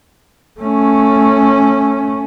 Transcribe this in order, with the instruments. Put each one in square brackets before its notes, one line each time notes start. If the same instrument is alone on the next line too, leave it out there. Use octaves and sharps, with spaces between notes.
[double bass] A3 C#4